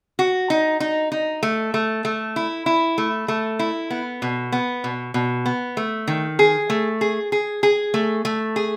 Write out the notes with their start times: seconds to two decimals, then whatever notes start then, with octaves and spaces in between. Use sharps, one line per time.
0.19 F#4
0.50 D#4
0.80 D#4
1.12 D#4
1.43 A3
1.74 A3
2.05 A3
2.36 E4
2.66 E4
2.98 A3
3.28 A3
3.59 E4
3.90 B3
4.22 B2
4.52 B3
4.84 B2
5.14 B2
5.46 B3
5.77 A3
6.08 D#3
6.39 G#4
6.70 A3
7.01 G#4
7.32 G#4
7.63 G#4
7.94 A3
8.25 A3
8.56 G#4